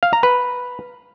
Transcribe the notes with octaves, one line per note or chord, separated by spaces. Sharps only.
F5
A#5
B4